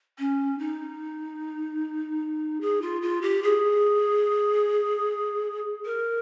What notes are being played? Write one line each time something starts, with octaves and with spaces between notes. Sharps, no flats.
C#4
D#4
G#4
F4
F4
G4
G#4
A#4